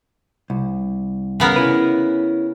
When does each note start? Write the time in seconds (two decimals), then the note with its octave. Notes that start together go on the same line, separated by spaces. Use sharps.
0.50 C2
1.40 C#3 B3 A#4
1.56 C#4 E4 B4